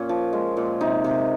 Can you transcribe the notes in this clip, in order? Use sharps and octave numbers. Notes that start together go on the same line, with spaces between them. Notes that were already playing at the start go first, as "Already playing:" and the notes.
Already playing: A#2 C#4
F3
G#3
A#2
C3 D#4
C3